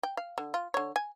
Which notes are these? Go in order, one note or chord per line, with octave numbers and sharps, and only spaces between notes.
G5
F5
D3
F4
D3 C#5
G#5